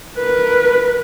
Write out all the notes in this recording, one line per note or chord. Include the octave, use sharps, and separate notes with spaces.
A#4 B4